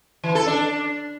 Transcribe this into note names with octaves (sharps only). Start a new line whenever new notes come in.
E3
A4
D4